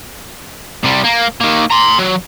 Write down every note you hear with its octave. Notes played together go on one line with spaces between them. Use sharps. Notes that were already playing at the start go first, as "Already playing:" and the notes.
C3 G3
A#3
D#3 A#3
A#5 C6
F#3